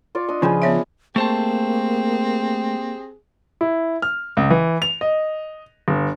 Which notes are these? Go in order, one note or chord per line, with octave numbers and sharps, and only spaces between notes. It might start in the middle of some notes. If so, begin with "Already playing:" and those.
F4 D5 C#6
D4 D#5
C#3 F3 G#4 B4
B3 C#5 E5
A3 A#3 C4 G4 G#4 C5 A5
E4
F6
C#2
E3
F7
D#5
G1